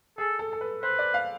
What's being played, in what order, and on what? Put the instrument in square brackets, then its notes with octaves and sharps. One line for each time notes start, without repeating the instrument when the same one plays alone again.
[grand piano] G#4 [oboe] A4
[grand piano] A4
A4
B4
[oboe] B4 [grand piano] C5
[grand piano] D5
F5